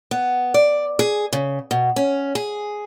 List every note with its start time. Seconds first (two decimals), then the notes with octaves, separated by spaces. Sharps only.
0.11 B3
0.54 D5
0.99 G#4
1.33 C#3
1.71 B2
1.96 C#4
2.35 G#4